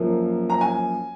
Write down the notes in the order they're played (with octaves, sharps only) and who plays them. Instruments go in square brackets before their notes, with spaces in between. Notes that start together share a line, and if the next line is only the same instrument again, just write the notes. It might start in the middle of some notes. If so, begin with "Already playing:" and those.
Already playing: [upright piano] F#2 F3 A#3
A#5
G#5